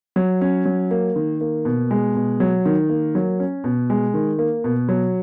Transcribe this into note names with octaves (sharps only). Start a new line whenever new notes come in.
F#3
C#4
F#3
A#3
D#3
A#3
B2
G#3
B2
F#3
D#3
A#3
F#3
C#4
B2
G#3
D#3
A#3
B2
F#3